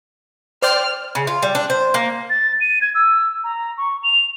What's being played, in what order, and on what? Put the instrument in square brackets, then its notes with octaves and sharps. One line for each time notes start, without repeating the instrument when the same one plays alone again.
[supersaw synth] C5 D5 G5 [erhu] F6
[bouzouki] C#3
F4
G3
D4
C5
A#3
[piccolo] A6
D#7
G#6
E6
A#5
C#6
F7